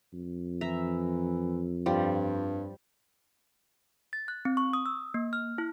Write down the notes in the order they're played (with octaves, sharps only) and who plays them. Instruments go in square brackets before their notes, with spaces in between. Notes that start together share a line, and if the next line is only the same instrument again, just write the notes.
[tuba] F2
[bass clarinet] E3 [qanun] E5 A#5
[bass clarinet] G2 [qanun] F3 G3
[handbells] A6
F#6
C4
C#6
D#6
E6
A#3
F6
E4